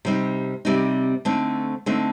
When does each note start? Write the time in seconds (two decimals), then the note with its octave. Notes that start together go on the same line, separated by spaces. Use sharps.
0.05 C3 G3 C4 D#4
0.65 C3 G3 C4 D#4
1.25 D3 A3 C4 D#4
1.86 D3 A3 C4 D#4